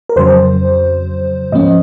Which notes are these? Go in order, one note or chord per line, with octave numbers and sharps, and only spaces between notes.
A#4
F2 C#3 F#3 C5
G#2 F3 A#3 C#4 D#5